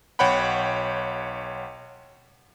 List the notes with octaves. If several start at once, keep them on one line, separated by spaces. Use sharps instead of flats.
B1 C#5 F#5 G5 B5